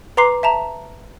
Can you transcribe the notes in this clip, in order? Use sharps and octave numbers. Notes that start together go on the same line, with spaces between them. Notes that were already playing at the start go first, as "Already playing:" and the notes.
B4 A#5 C6 D6 C7
E5 A5 A#5